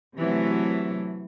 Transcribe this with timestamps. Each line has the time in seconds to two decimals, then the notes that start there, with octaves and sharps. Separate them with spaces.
0.17 C3 E3 F#3 A3